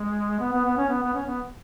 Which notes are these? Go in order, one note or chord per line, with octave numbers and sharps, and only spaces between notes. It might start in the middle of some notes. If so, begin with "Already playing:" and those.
Already playing: G#3
B3
B3
B3
C#4
B3
B3
C#4
B3